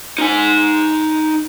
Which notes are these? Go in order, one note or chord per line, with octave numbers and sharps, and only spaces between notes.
D#4 G#5